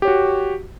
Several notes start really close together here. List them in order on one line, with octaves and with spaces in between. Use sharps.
G4 C#5 F#4